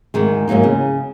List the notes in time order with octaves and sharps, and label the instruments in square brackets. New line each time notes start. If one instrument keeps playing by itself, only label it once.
[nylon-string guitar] D2 G#2 D#3 G#3
E2 G#2 F#3 A#3 D#4
C#3